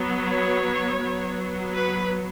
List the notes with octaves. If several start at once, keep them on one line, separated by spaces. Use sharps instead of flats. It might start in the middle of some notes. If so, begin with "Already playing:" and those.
Already playing: F#3 B3
C#5
F#3 B3
B4